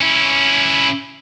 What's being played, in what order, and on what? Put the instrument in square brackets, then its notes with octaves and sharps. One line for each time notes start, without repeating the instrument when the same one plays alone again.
[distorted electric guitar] C#4 E4